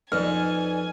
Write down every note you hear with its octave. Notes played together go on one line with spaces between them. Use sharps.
F2 D#4 B4 D5 G#5 F6